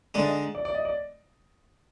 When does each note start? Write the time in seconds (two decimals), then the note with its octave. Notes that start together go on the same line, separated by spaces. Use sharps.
0.14 D3 G#3 D#4 D5
0.25 D#5
0.55 D5
0.65 D5
0.75 D#5
0.85 D5